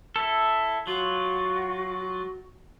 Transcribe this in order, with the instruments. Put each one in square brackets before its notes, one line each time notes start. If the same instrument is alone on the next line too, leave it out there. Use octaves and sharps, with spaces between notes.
[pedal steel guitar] E4 A4
[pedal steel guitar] F#3 F4 [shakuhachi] F#4